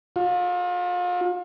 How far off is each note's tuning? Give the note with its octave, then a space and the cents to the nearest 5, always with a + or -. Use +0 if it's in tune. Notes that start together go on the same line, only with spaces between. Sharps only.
F4 +35